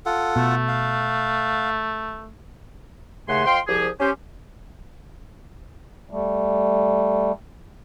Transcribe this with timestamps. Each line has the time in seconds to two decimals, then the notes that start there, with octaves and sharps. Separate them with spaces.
0.06 F4 A4 F#5
0.36 B2 A3
0.68 F5
3.28 D#2 C#3 A3 F#5 G#5 C6
3.45 F2 F5 G5 C6
3.67 C2 F3 G4 G#4
4.00 C#4 G4 C5
6.10 G3 A3